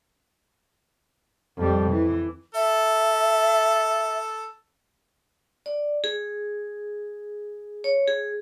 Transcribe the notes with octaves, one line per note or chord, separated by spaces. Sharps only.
F2 G3
E3
A4 E5
D5
G#4
C#5
G#4